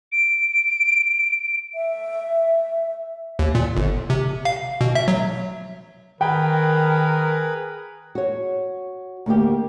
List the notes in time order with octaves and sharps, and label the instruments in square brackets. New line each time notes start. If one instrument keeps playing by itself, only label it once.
[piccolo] D7
[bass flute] E5
[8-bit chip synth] D#2
A#2
G1
C3
F5
B2
E5
F#3
[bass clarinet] D#3 [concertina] G#4 B4 B5 [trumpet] A#4 [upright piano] G5
[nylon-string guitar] F#4 C#5
D2 A#3 G4